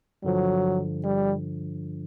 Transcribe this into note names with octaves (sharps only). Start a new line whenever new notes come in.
G2 D3 F3 F#3
G3